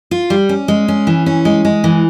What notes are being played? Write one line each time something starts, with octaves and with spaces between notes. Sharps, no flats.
F4
G3
C#4
G#3
C#4
E3
C#4
G#3
G#3
E3